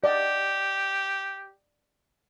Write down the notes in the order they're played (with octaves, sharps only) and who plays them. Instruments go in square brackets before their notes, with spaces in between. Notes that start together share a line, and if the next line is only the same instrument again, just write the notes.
[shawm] G4 [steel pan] D5 D#5 F#5